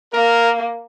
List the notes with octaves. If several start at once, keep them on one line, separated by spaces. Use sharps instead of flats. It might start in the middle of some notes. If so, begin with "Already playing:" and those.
A#3 A#4